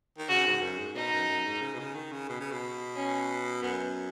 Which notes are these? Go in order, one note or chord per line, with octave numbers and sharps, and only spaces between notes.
D#3
C#3 F#4
G#2
F#2
G#2
B2 D#4
F#2
F#2
G#2
C#3
B2
C#3
D#3
C#3
B2
C#3
B2
C#4
F#2 B3